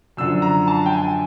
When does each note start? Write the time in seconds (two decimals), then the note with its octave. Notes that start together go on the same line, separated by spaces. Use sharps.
0.17 F#2 D3 F3 E6
0.42 A#5
0.68 A5
0.86 G5
0.92 G#5